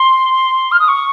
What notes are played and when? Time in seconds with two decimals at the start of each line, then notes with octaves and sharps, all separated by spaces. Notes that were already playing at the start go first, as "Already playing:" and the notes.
Already playing: C6
0.72 F6
0.80 D#6
0.88 C#6